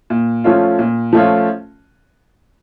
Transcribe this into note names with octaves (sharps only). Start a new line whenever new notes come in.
A#2
F3 A3 C#4 F4
A#2
F3 A3 C#4 F4